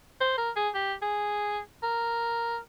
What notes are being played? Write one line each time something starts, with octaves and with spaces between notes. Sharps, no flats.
C5
A#4
G#4
G4
G#4
A#4